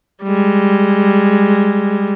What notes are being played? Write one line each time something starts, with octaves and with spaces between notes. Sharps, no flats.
G3 G#3